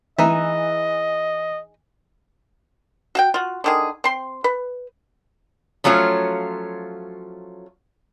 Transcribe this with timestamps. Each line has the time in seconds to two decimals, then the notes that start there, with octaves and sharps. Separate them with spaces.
0.18 E3 D#4 G#4 D#5 E5
3.15 F#4 F5 G5
3.34 F4 F#4
3.64 D3 D#3 G#4
4.04 C4 C6
4.44 B4
5.84 F3 F#3 A3 C#4 F4